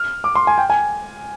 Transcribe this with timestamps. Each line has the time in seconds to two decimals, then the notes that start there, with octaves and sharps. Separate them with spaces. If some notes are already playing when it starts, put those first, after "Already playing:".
Already playing: F6
0.24 D6
0.35 C6
0.47 G#5
0.58 G5
0.70 G#5